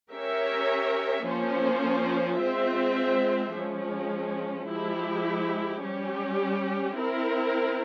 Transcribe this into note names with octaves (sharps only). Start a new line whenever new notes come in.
C#4 G4 A#4 C#5 E5
F3 A#3 C#4 F4 C5
G#3 C4 F4 C5 E5
F3 G#3 C#4
F3 G#3 E4 G4
G3 C#4 G4
C4 E4 A#4